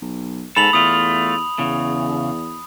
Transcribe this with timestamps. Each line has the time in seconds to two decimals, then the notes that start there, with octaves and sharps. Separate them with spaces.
0.02 B1
0.56 G#2 B3 A4 B5 F7 F#7
0.73 E2 A3 F4 D#6
1.59 E2 C#3